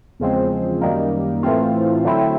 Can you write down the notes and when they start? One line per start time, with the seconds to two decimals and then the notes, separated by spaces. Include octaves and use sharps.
0.20 E2 C#3 F3 G#3 C4
0.81 F#2 D#3 G3 A#3
1.43 A2 E3 A3 C4 F4
2.05 D3 F#3 A3 C4 E4